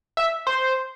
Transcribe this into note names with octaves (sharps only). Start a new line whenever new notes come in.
E5
C5